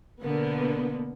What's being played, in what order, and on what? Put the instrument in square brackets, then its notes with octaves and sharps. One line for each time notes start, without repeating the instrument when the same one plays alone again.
[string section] B2 D3 A#3 B3